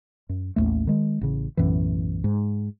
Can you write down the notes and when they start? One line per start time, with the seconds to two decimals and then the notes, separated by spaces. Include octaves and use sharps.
0.29 F#2
0.56 A1 D#2 A2 A3
0.87 D#3 G#3
1.21 A1 C#3
1.57 B1 F#2 A2 E3
2.24 G#2